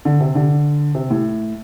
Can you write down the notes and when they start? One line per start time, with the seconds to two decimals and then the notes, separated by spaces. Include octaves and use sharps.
0.05 D3
0.20 C3
0.35 D3
0.95 C3
1.11 A2